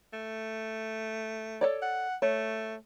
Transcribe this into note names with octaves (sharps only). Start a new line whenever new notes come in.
A3
A4 C#5 D5
F#5
A3 C#5